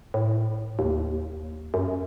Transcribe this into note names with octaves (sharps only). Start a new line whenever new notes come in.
A2
D#2
F#2